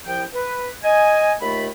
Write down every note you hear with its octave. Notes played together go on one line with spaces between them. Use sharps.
C2 F3 E4 G5
B4
D#5 G#5
D#2 A3 F4 B5